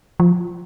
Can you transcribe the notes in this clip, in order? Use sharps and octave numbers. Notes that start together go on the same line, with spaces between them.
F3